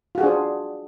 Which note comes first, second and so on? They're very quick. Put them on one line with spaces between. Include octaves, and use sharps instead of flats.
F4 F#4 G#4 D4 C5